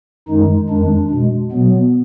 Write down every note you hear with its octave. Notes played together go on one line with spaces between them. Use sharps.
F#2 D#3 G#3 D#4
F2 D#3 G#3 D4
B2 G#3
B2 F#3 B3